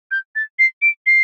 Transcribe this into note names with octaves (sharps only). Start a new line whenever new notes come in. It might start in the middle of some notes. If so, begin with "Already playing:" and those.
G6
A6
C7
D7
C7